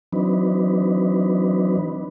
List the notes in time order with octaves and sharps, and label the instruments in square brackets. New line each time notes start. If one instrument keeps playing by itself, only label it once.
[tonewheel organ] E3 F#3 C4 D4 D#4 B4